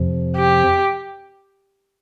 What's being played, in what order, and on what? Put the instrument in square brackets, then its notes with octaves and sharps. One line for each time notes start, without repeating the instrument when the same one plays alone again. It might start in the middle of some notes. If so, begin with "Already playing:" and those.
Already playing: [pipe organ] F2 C3 F3
[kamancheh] G4